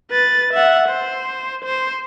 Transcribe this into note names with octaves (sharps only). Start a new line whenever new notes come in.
B4 A6
E5 F#5
C5
C5